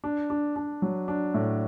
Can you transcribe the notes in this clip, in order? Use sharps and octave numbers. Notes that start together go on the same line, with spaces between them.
D4
D4
D4
F#3
D4
A2